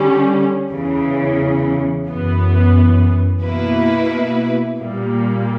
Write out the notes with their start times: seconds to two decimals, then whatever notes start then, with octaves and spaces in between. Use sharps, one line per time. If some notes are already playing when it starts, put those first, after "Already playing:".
Already playing: D3 G3 C#4
0.70 E2 C#3 E3
2.07 F#2 E3 B3
3.43 B2 A#3 E4 B4
4.79 A#2 G3 A#3